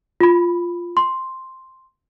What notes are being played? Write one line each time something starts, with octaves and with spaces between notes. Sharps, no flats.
F4 B5
C6